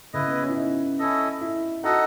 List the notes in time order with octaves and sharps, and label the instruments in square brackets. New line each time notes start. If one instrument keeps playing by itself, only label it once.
[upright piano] C#3 [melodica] E4 B4 D#5
[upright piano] B3
C#4
E4
D#4
[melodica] C#4 E4 A4 D#5
[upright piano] E4
[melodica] D#4 A4 D#5 F#5 [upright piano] F#4